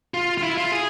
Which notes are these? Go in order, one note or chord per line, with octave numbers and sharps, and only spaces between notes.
F4
F4
E4
F4
G#4